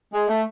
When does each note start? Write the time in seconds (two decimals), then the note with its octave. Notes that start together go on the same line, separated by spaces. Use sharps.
0.13 G#3
0.28 A3